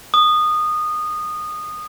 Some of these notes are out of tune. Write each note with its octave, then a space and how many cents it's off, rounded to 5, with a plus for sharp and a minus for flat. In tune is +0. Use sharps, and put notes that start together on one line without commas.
D#6 -20